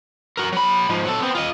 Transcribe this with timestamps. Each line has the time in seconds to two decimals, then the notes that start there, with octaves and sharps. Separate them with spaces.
0.37 F#4 A#4
0.52 F#3 B5
0.89 G#2 F3
1.05 F#3 A4
1.20 B3 C4
1.35 F4 D#5